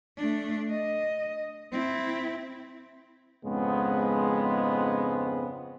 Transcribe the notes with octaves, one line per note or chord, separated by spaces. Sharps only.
A3 D4
D#5
C4 E4
F2 G#2 C#3 G#3 B3 C4